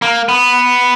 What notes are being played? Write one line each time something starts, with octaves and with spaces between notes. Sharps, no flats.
A#3
B3